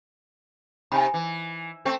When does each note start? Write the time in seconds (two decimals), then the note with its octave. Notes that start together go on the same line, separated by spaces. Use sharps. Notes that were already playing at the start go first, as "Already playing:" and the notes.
0.92 C3 D#4 G#5 B5
1.14 E3
1.85 A3 C4